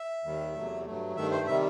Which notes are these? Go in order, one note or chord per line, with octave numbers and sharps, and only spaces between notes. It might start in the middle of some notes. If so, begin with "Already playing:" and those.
Already playing: E5
D#2 D#3 G3
E2 C3 F#3 A3
G2 F#3 A3
G2 D#3 A3 E5
C5
C3 D#3 G3 E5